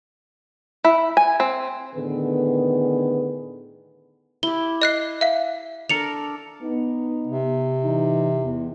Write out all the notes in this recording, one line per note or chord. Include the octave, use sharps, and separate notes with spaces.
E4
G#5
C4
A2 D3 D#3 B3 G#4 B4
E4 G4 G7
D#5 F#6 C7
E5 F5
D4 A4 A#4 C#7 F7
B3 D#4
C3
E3 D#4
E2